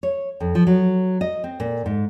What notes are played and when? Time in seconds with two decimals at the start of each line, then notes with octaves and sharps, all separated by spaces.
0.03 C#5
0.40 F2
0.55 F3
0.67 F#3
1.21 D#5
1.44 C4
1.60 A#2
1.86 G#2